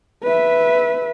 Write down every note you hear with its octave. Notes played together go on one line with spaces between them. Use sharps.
B4 E5